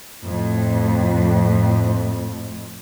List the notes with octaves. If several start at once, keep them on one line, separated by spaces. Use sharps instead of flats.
F2 A2